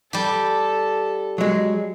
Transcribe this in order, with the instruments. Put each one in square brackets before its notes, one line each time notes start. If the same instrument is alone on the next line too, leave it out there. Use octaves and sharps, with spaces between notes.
[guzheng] G3 G4 [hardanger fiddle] A4
[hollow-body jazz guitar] F#3 G#3